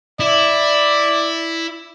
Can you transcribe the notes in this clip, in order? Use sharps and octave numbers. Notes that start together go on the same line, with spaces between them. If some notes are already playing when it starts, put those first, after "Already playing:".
E4 D5